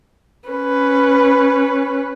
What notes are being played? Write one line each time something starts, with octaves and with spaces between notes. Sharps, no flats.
C#4 B4